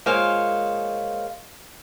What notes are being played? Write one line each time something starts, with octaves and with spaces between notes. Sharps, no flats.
G#3 A#3 F4 C5 C#5 F5